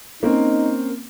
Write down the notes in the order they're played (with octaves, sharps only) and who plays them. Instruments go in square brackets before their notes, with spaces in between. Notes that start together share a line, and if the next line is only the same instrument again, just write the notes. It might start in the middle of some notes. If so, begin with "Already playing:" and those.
[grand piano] A#3 C4 C#4 [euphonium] D#4